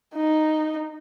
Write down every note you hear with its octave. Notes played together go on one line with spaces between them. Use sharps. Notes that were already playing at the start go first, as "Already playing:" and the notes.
D#4